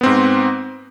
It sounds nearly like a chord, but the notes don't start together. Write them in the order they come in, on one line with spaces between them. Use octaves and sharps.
B3 C4 G#2